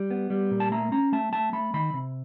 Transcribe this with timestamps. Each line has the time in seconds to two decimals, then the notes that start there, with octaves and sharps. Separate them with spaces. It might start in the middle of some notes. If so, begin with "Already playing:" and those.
Already playing: G3
0.11 B3
0.30 G3
0.51 A#2
0.60 A5
0.72 A3 A#5
0.92 C#4 A#5
1.12 A3 A5
1.33 A3 A5
1.53 A3 B5
1.74 D#3 B5
1.93 C3